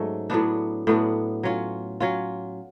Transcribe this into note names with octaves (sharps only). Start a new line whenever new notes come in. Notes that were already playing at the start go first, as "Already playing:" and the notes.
Already playing: G#2 F#3 A3 C#4
A2 F#3 B3 D4
A2 F#3 B3 D4
F#3 C#4 F4
F#3 C#4 F4